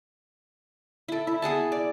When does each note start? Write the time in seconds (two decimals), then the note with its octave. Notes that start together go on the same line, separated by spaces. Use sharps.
1.08 E4 A4
1.27 E4
1.42 B3 G#4 F#5 A5
1.72 D5